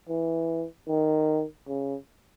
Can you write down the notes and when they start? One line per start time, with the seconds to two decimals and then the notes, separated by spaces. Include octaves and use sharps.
0.09 E3
0.88 D#3
1.68 C#3